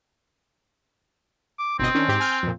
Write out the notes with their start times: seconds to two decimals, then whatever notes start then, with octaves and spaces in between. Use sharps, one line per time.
1.59 D6
1.79 G1 B2 C4 D#5
1.95 D#3 C#4 D4
2.08 G#2 G4
2.20 G#5 F6 G6
2.43 F2 A#2